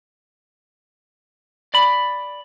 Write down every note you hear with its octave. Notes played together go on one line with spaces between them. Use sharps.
D5 B5